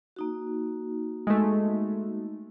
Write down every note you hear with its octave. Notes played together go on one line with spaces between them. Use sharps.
A#3 D#4 F#4
G#3 A3